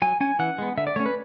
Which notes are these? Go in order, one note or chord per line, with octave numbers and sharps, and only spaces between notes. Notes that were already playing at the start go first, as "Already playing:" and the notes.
F#3 G#5
C#4 G#5
E3 F#5
G#3 B3
D3 E5
D5
A3 C#4 C#5
B4